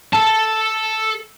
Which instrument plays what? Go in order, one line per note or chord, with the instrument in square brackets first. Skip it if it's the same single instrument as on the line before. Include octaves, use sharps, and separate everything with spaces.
[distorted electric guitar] A4 A5